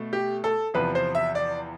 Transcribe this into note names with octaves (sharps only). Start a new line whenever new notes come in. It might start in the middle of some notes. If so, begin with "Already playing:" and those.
Already playing: B2 A3
G4
A4
E2 C3 F3 B4
C5
E5
D5